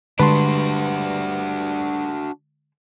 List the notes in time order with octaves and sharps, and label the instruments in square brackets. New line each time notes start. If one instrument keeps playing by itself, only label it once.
[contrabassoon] G2 [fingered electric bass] D3 G#3 [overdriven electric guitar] D4 F#4 [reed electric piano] B4 A5 C6